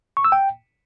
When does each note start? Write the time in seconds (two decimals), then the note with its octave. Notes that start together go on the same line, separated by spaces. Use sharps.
0.17 C#6
0.24 E6
0.32 G5